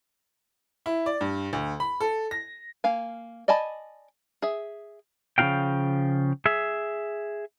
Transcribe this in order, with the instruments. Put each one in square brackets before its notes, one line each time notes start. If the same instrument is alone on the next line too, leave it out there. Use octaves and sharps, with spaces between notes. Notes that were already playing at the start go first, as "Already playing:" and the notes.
[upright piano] E4
D5
G2
D2
B5
A4
A#6
[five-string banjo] A#3 F5 G#5
D5 D#5 G#5 A5 B5
G#4 E5
[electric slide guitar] C#3 F3 D#4 F#4 F5 G5
G#4 E5